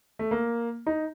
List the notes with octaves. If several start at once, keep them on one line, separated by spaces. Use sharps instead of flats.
A3
A#3
D#4